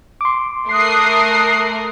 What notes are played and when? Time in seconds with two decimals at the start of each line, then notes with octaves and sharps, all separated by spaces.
0.21 C6 D6
0.69 A3 A#4 D#6 F#6 C7